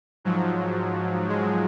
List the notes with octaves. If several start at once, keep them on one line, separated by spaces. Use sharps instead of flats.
G#2 F3 F#3
G#3